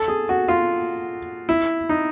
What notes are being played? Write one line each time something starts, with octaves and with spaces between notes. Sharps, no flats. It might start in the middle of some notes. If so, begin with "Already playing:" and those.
Already playing: A4
G#4
F#4
F4
E4
D#4